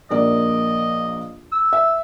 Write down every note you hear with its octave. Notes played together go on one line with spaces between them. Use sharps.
A#1 A#3 D5 D#5
E6
E5